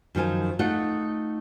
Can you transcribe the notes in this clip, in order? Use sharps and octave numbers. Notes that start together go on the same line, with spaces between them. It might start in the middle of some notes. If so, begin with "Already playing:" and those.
F#2 D#3 F3 G#5
A3 D#4 F4 F#5